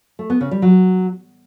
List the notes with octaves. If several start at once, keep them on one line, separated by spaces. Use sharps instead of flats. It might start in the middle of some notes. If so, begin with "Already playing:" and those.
A3
B3
C#3
G3
F#3